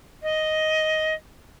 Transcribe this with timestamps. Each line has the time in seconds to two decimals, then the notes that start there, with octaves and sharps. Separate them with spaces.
0.22 D#5